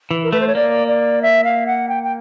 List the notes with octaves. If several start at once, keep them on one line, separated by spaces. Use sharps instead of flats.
E3
A#4
A3 B4
C5
C#5
A#3 D5
D5
E5
F5
F#5
G5
G5